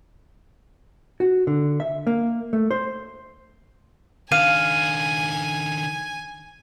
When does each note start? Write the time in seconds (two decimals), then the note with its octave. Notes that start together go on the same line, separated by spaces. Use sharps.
1.20 F#4
1.47 D3
1.80 E5
2.07 A#3
2.53 A3
2.71 C5
4.32 D#3 D4 F5 G#5 D#7